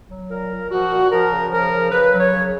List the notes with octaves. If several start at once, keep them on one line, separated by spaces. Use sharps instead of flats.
F#3
A#2 A#4
A#2
F3 F#4
A#2
F3 A#4
C#3
F3 A#4
C#3
C#3 B4
F#3
C#5
C#3